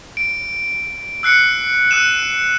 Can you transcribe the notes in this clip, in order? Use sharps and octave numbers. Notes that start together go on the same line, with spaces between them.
D7
E6 F#6 C7 C#7
E6 F#6 D#7 E7